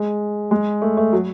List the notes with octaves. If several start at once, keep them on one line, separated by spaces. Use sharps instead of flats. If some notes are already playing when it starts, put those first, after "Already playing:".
Already playing: G#3
G#3
A3
A3
F#3